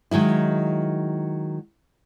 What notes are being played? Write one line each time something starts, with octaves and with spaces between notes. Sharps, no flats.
D#3 F#3 G#3 E4